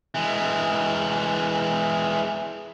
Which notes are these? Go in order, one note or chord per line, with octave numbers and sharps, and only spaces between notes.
E3 G#3